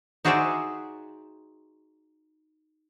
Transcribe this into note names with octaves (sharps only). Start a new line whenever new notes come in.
D#4 F#4 G#4 C5 D5 E5